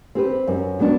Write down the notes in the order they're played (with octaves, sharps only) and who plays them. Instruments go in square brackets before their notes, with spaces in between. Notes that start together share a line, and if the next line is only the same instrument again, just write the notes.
[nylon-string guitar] C4 G4 B4
F#2
F#3 B3 D4